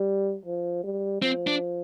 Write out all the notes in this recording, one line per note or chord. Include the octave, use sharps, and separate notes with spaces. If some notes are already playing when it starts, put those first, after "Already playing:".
Already playing: G3
F3
G3
F3 C4
D4